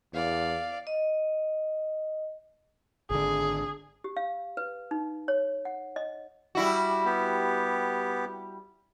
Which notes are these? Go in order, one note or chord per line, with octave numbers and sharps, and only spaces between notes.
E2 D5 F5
D#5
G#1 D3 G#4
G4
F5
B4
D#4
C#5
F#5
D#5
G3 E4 F#4
B3 G4